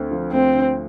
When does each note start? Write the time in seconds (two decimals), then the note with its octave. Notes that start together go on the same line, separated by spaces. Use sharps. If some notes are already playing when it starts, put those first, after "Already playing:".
Already playing: D2 D3 C4
0.11 F3
0.32 D2 C4
0.54 D3